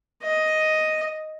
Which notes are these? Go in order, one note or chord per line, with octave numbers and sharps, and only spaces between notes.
D#5